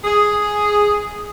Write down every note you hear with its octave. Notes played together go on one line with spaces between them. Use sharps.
G#4